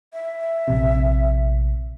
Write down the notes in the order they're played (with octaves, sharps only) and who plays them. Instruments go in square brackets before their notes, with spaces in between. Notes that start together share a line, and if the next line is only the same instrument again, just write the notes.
[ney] E5
[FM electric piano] A#1 C3